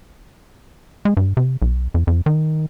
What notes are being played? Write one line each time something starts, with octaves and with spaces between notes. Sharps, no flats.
G#3
G2
C3
B1
F2
F2
D#3